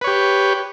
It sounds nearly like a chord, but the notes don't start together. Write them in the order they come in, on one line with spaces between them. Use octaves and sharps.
B4 C#5 G4